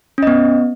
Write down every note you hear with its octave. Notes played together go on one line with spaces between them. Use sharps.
B3 C#4 D#5